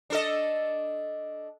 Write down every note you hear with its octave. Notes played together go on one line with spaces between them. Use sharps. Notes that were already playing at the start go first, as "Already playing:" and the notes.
D4 A4 D#5